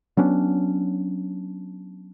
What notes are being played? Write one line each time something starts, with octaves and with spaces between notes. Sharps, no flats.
F#3 B3 C#4 D4